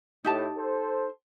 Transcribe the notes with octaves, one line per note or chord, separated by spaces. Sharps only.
A2 D#4 G4 A5
A4 C5